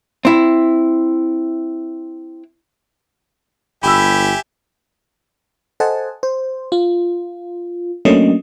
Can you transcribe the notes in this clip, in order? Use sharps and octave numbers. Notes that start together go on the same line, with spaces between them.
C4 E4
G1 G4 E5 G#5 B5 E6
A4 C5 D#5 F#5 G#5 A5
C5
F4
F#3 A3 A#3 C#4 D4 D#5